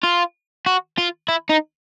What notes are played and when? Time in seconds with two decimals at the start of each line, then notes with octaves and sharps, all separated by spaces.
0.03 F4
0.66 F#4
0.98 F4
1.29 E4
1.50 D#4